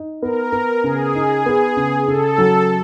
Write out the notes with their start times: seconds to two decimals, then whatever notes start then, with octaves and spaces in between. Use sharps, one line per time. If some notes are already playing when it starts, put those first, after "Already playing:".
Already playing: D#4
0.22 B3 A#4
0.52 B3
0.84 C#3 G#4
1.15 D#4
1.46 B3
1.77 C#3
2.07 C#3 A4
2.38 F#3